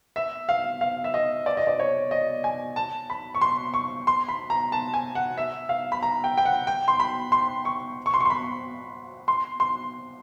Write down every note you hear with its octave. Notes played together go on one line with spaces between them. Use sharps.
E5
F5
F5
E5
D#5
D5
D#5
D5
C#5
D#5
G#5
A5
B5
C#6
C6
C#6
C6
B5
A#5
A5
G#5
F#5
E5
F5
B5
A#5
G5
G5
F#5
G5
C6
B5
C6
C#6
C#6
C6
C#6
C6
B5
C6
C6